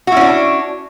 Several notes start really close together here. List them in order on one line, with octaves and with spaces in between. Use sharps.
F#4 E4 C#4 D4